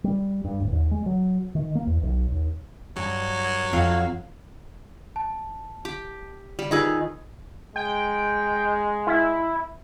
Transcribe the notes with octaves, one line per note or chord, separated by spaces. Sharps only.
G3
G2
D1
D#2
G#3
F#3
D#3
A#3
E2
B1
D#2
G2 F#3
F2 F5
A5
G4
G3
D#3 F4 G#4 B4 E6
G#3 G5
E4